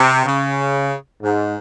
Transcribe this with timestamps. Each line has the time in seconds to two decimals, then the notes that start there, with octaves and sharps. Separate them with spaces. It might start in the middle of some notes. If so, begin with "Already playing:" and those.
Already playing: C3
0.25 C#3
1.22 G#2